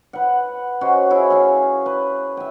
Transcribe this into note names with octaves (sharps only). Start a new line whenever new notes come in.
B4 F#5
C#4 F#4 C5 D#5
E4 G#4 C#5
C#5 F5 G#5
B4
E5 G5